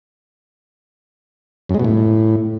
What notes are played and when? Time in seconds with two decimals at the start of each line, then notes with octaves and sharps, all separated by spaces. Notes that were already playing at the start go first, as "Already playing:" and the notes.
1.69 F#2
1.74 G#3
1.79 B2
1.85 A2